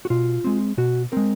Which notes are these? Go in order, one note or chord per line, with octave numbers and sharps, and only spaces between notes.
F#4
B2 F4
G#3 C4
B2 F#4
G#3 C4 A#4